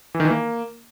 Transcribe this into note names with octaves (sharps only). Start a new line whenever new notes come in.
E3
D#3
E3
A#3